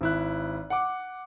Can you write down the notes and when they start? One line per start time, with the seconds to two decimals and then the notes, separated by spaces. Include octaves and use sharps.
0.01 G#1 E4 F#6
0.70 F#5 D6